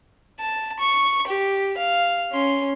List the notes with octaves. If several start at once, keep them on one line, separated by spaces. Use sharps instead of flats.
A5
C#6
G4
F5
C#4 C6